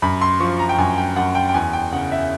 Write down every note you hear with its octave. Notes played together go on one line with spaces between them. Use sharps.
F#2 B5
C6
F3 C#6
A#5
G5
F#2 G#5
G5
F#2 F#5
G5
G5
E2 G#5
G5
C#3 F#5
E5